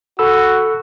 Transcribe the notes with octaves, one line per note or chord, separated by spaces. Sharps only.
F#4 A4 B5 E6